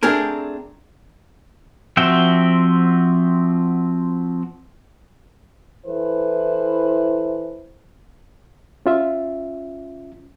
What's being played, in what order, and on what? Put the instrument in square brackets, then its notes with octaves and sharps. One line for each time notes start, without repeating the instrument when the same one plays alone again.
[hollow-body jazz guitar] A3 C4 D4 G4 G#4 A#4
[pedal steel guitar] F3 C4 F#4 E5 G5
[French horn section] E3 E4 A4 B4 C5
[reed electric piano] C#4 F4 E5